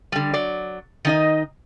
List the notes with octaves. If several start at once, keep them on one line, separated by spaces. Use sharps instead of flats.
D3 G3
F#3 D5
D#3 D#4 D#5